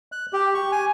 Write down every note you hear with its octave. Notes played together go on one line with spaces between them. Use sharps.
F#6
G4
C#6
G#5